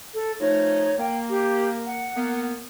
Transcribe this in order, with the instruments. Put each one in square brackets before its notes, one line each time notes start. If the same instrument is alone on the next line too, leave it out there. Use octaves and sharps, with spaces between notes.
[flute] A4
[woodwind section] F3 A3 D#4 [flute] C#5
[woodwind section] A#3 [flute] G5
[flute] G4
F#5
[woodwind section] A#3 B3